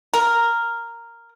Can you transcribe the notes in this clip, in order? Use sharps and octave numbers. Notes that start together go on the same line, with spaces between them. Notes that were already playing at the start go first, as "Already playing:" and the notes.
A#4